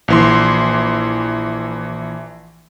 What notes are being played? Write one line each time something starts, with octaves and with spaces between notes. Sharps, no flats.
A#1 E3 C6